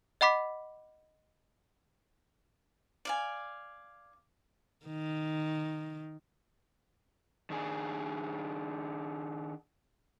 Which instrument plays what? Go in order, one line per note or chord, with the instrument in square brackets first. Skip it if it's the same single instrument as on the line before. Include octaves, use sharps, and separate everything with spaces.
[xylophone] D#5 F#5 B5 D6 B6
[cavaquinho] D5 F5 G#5
[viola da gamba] D#3
[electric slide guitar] D#3 D4 G#4